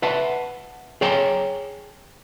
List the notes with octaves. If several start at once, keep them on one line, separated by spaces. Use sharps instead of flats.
B4 E5 F#5 A5
G#4 C#5 G5 A5 A#5